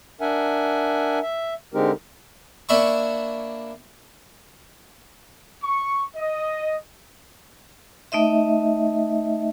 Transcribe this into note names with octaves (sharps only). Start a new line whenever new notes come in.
D4 A#4 E5 F#5 G#5
E5
D3 G#3 C4 D#4 G4 A#4
A#3 D4 E4 B5 C#6
C#6
D#5
A3 D#4 D#5 E5